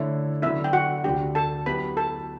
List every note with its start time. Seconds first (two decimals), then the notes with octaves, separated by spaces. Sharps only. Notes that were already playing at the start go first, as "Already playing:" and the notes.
Already playing: D3 A3 E4 A4 C#5
0.42 D3 F#3 B3 E4 E5
0.64 G5
0.73 F#4 F#5
1.04 D2 D3 A3 D4 G4 G5
1.35 A4 A5
1.66 F#3 B3 E4 G4 B4 B5
1.97 A4 A5